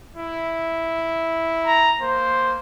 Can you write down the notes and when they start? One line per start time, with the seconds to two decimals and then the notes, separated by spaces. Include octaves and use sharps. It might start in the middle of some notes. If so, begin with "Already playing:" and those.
0.16 E4
1.66 A#5
2.02 A#3 C5